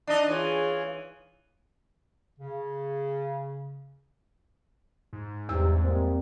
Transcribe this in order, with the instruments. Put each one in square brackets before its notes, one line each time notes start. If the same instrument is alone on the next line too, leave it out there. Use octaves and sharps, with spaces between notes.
[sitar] D4 D#4 D#5
[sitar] E3 [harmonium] F4 G#4 C#5
[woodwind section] C#3
[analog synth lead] G#2
[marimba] E2 E6 [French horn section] G2 C3
[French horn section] G3 A#3 C4